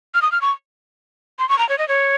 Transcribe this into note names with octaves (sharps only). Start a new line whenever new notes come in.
F6
D#6
F6
C#6
C6
C#6
A#5
C#5
D#5
C#5